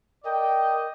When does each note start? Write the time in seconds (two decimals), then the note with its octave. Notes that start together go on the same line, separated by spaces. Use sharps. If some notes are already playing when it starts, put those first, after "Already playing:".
0.24 A#4 D5 D#5 G5